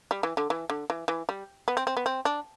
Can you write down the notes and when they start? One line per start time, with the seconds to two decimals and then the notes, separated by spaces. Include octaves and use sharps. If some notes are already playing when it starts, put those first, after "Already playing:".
0.11 G3
0.23 E3
0.37 D3
0.50 E3
0.70 D3
0.90 E3
1.08 E3
1.29 G3
1.68 B3
1.77 C4
1.87 C4
1.97 B3
2.06 C4
2.25 D4